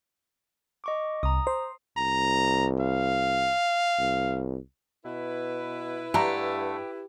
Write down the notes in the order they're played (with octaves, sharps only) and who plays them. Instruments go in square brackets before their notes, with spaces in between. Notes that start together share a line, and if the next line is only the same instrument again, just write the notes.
[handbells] D#5 C#6 D6
[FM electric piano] C2 [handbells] A#5 D#6
[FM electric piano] C5
[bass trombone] C2 [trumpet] A#5
[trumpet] F5
[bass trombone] C2
[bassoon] B2 [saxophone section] E4 B4
[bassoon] G2 [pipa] D3 A3 A#5 [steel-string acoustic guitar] G4